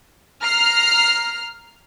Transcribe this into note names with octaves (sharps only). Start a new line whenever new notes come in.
A#5 F6 C7